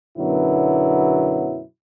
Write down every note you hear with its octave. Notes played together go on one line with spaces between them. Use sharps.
F#2 B2 D3 F#3 B3 E4